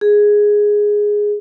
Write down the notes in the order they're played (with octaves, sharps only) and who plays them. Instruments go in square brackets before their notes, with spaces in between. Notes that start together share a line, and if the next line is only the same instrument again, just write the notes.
[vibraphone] G#4